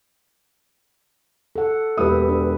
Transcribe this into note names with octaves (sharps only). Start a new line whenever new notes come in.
A4 F#5
E1 G4 B4 E5 D#6
D4